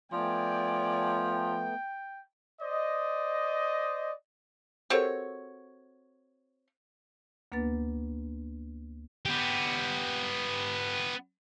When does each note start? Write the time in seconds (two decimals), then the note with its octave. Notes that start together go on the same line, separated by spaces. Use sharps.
0.12 F3 A3 B3 D5 G5 G#5
2.61 C5 D5 D#5
4.90 C4 F#4 G4 A4 A#4 C#5
7.52 D2 A#3 B3 D4 B4 A6
9.25 B3 G4